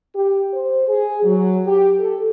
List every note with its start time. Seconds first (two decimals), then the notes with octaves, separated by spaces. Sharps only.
0.15 G4
0.53 C5
0.88 G#4
1.23 F#3
1.66 G4
1.99 A4